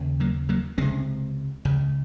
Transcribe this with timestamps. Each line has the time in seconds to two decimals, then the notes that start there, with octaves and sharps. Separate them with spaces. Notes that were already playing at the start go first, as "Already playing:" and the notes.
Already playing: D#2 C#3
0.20 F#3 A#3
0.49 F#3 A#3
0.78 C#2 C3 G#3 C4
1.65 C#2 C#3